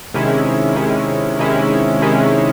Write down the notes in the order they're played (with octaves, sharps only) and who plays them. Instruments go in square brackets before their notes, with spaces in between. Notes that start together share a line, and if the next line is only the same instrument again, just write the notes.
[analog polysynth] C3 D#3 G#3 C#4 E4
C3 D#3 G#3 C#4 E4
C3 D#3 G#3 C#4 E4
C3 D#3 G#3 C#4 E4